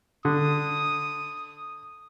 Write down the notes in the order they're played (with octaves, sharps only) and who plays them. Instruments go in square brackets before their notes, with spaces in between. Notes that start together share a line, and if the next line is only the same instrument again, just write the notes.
[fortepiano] D3 [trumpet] D#6